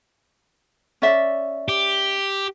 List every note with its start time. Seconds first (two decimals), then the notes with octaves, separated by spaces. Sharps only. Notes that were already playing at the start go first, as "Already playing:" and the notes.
1.02 C#4 D5 E5
1.68 G4